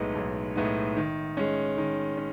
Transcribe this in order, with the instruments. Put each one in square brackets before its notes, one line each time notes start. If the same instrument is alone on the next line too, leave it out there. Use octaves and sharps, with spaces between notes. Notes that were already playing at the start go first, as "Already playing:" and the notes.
Already playing: [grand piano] B1 A2 G#3 B3 D#4
B1
A2 G#3 B3 D#4
D#3
G#3 C#4
D#3
C#4